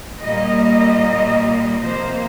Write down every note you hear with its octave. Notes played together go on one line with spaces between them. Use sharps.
A#2 G3 A#3 D#5
C3 F3 A#3 C5